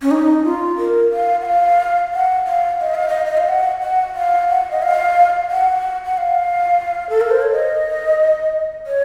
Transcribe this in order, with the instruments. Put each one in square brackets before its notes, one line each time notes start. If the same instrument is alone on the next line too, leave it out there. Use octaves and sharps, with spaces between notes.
[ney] C#4
D#4
F4
A#4
F5
F#5
F5
F#5
F5
D#5
F5
D#5
D#5
F5
F#5
F#5
F5
F#5
D#5
F5
F#5
F#5
F5
A4
A#4
C5
C#5
D#5
C#5